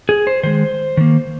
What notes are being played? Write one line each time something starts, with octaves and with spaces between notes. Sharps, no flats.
G#4
C5
D#3 G#3 C5
D#3 A#3